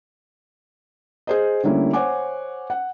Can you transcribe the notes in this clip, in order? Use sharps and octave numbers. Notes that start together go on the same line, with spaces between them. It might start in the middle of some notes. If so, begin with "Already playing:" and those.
G#4 C5 D#5
D3 G3 A3 A#3 C#4 E4
C5 C#5 F#5 G#5 D6
F#5